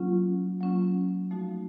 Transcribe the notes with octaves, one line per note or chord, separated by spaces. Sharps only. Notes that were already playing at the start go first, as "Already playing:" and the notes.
Already playing: F#3 A#3 C#4 F4
F#3 A#3 C#4 F4
F3 A3 D#4 F#4